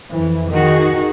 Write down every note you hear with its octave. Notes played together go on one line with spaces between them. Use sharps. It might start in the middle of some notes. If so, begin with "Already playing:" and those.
F2 E3
D#3 D#4 F#4 G#4